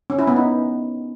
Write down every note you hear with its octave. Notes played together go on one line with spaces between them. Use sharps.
C#4
E4
B3
D#4